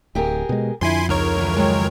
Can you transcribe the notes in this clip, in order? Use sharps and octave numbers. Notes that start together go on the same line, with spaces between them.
D1 G4 G#4 A#4
B2 G#3
F2 D3 E4 G#5 C6
C#2 D#4 A#4 C#5
D3 E3
D#3 F#3 G#3